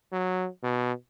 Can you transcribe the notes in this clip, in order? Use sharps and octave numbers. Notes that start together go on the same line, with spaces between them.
F#3
B2